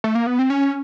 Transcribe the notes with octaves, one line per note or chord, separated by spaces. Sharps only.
A3
A#3
B3
C4
C#4